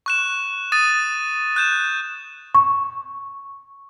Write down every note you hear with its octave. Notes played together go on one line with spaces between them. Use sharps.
C#6 F#6 E7
D#6 A6 D#7
F#6 G6 E7
C#6